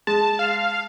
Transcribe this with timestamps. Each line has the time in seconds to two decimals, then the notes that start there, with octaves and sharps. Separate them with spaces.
0.07 G#3 A5
0.39 F5